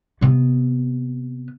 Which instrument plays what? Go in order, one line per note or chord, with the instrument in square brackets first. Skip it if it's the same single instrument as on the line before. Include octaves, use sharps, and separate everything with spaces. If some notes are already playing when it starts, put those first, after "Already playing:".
[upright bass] C3 B3